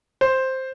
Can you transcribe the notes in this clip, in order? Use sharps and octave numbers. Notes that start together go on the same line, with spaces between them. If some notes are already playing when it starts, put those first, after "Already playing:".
C5